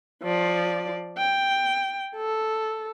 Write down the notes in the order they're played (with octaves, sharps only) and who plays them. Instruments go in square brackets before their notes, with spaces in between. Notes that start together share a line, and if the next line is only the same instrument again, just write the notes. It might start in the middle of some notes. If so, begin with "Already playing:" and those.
[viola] F3 D5
G5
A4